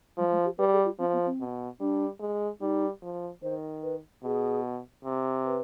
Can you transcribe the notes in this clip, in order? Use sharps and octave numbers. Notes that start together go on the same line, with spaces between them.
F3 G3
G#3
G4
G3 B4
G#4
F4
F3 C4
B3
C4
B2
G3 D4
G#3
G3 D#4
F3
D#3 C5
B4
B2 G#4
C3
B4